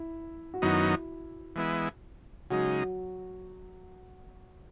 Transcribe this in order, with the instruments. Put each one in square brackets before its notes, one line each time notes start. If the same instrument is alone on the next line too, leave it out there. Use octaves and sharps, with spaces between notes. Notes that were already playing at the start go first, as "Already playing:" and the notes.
Already playing: [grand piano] E4
F#4
[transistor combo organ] F#2 D#3 F#3 B3 D#4 [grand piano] E4
[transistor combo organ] E3 G#3 B3 E4
[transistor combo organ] C#3 G#3 D#4 [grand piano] F#3 F#4